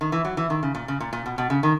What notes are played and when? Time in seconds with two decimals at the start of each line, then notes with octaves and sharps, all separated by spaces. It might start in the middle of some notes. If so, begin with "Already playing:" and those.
0.01 D#3
0.12 E3
0.25 F#3
0.37 E3
0.50 D#3
0.63 C#3
0.75 A#2
0.88 C#3
1.00 A#2
1.13 A#2
1.26 B2
1.38 B2
1.50 C#3
1.63 D#3